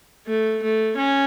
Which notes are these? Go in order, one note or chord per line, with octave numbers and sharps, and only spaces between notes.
A3
A3
C#4